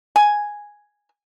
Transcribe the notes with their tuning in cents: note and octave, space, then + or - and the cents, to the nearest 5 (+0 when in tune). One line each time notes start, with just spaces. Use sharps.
G#5 +0